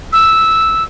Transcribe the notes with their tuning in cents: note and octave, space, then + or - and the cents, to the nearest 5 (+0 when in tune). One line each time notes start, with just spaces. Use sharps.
E6 -5